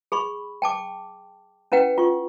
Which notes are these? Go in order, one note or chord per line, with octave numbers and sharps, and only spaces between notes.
G#4 B5 C#6
G5 A5 D6
C#4 E4 B4 F#5 G5
F4 C#6